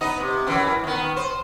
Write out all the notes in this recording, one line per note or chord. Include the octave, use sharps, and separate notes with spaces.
B3 D#4 D#5
C3
F#2 E3
D#3 B3
C5